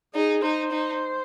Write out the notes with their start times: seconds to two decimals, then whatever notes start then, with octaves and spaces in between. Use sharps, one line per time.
0.15 D#4 G#4
0.43 D#4 C5
0.72 D#4